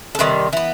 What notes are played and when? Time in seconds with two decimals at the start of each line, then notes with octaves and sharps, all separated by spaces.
0.15 A4
0.19 C3 D#3 G3 B4
0.53 E3 B3